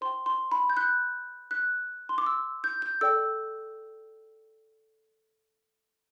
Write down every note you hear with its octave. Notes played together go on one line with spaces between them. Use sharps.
C5 G5 C6
C6
B5
G6
F#6
F#6
C6
D6
E6
G6
G6
A4 D5 G5 E6